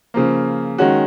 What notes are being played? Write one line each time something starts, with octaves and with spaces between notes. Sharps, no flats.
C#3 F3 A#3
D#3 G#3 C#4 F#4